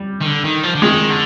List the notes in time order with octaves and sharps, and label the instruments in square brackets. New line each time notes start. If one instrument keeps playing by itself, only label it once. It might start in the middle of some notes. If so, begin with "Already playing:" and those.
Already playing: [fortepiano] G3
[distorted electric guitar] D#3
D3
D#3
F3
D3
[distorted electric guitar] D#3 [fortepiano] G#3
[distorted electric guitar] D3